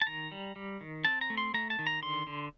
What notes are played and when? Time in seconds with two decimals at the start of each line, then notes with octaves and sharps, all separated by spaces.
0.01 A5
0.07 D#3 A#5
0.32 G3
0.56 G3
0.81 D#3
1.05 C4 A5
1.21 A#5
1.30 A3
1.37 C6
1.54 A3 A#5
1.70 A5
1.79 D#3
1.87 A#5
2.02 D3 C6
2.27 D3